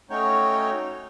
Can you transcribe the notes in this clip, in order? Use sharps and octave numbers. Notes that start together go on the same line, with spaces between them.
A3 C#4 D#4 F#4 C#5 G5